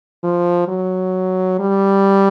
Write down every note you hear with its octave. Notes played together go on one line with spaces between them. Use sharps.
F3
F#3
G3